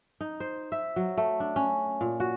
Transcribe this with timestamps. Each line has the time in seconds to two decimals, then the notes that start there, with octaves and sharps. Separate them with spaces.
0.21 D#4
0.40 C5
0.72 E5
0.96 F#3
1.17 A3
1.40 D4
1.56 C#4
2.01 A#2
2.20 F#4